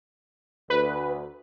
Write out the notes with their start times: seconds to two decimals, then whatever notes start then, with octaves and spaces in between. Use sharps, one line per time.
0.70 D2 B4